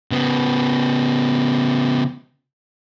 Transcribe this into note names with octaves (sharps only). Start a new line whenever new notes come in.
C#3 B3